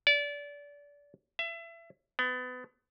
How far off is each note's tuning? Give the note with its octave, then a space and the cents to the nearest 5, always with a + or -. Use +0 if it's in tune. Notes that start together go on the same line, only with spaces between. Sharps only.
D5 -25
E5 +30
B3 +30